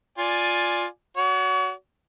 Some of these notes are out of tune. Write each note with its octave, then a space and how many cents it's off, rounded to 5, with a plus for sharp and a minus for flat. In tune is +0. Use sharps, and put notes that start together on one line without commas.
F4 +10 D5 +0 G#5 +0
F#4 +0 C#5 +40